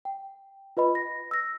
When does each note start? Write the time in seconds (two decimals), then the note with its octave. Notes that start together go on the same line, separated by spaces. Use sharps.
0.05 G5
0.77 F4 B4 D#5 B5
0.95 A#6
1.31 E6 A#6